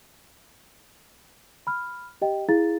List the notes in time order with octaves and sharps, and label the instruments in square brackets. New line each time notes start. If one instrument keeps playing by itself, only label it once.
[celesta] B5 F6
G4 D#5 G5
E4 G#4 F5 A#5 A6